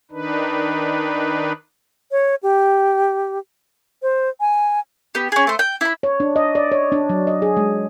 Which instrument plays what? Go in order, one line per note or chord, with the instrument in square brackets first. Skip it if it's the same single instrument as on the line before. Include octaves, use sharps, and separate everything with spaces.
[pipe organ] D#3 D4 D#4 B4
[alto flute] C#5
G4
C5
G#5
[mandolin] B3 G4
C#4 G#4
A3 C5
G5
E4 B5
[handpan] C#5
D4
D#5
D5
C#5
D4
F#3
D#5
G#4
G#3